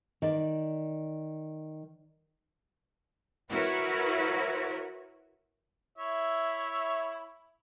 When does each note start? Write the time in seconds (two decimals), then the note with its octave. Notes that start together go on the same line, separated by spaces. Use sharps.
0.22 D#3 D5
3.48 E4 F#4 A#4 B4 C#5
5.98 E4 C#5 E5